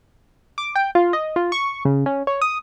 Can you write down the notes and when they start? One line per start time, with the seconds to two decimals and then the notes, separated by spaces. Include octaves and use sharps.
0.58 D6
0.75 G5
0.95 F4
1.13 D#5
1.36 F4
1.52 C#6
1.85 C#3
2.06 C#4
2.27 C#5
2.41 D#6